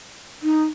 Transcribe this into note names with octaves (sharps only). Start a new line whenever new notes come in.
D#4